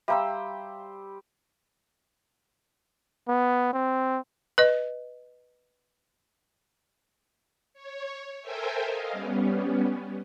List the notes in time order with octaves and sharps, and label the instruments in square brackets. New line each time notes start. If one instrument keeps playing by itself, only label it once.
[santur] G3 C5 E6 [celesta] E5 F5 A#5
[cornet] B3
C4
[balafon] B4 D#5
[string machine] C#5
A4 A#4 C5 E5 G5 G#5
D#5 F5
G3 B3 C#4